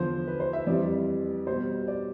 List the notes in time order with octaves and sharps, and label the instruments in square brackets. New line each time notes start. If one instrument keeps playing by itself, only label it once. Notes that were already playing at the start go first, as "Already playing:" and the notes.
Already playing: [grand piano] E2 D3 F3 C5
B4
C5
E5
F2 E3 G3 D5
B2 G3 C5
D5